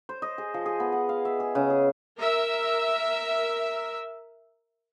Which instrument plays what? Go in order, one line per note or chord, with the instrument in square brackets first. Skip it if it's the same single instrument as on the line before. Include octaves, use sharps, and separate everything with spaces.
[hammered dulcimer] C5
D#5
G#4
F3
G#4
B3
F#5
F5
E5
G#4
C#3
G#4
[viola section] A#4 E5